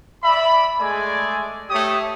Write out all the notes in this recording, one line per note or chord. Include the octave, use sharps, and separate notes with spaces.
D5 E5 B5
G#3 A3 G#4 D5 G#5
A3 G4 C#5 D#6